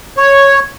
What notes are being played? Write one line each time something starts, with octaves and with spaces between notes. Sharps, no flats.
C#5